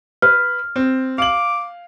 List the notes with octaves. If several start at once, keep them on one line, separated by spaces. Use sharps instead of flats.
B4 F6
C4
F5 D6 F#7